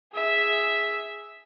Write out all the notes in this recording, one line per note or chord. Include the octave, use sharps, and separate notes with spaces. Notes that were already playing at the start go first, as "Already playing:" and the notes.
G#4 E5